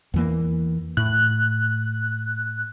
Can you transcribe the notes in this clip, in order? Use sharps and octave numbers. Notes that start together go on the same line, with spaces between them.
E2 E3 A#3
A2 F#6